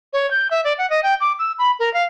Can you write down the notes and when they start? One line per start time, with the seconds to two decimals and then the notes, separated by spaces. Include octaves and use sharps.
0.13 C#5
0.31 G6
0.51 E5
0.64 D5
0.78 F#5
0.90 D#5
1.03 G5
1.20 D6
1.39 E6
1.58 B5
1.79 A#4
1.94 F5